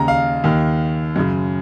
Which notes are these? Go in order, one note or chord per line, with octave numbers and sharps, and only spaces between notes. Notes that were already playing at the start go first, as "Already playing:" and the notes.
Already playing: D#2 C#3 A#5
F5
D#2 D#3
F#2 C#3